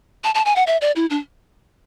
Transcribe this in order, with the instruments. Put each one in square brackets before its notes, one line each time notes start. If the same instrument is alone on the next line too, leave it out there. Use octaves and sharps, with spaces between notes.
[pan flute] A5
A5
G#5
F#5
E5
D5
E4
D4